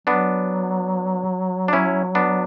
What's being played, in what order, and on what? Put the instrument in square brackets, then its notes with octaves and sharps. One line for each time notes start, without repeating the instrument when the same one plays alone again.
[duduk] F#3 [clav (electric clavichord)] B3 D4
[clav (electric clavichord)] D4
C#4 E4
B3 D4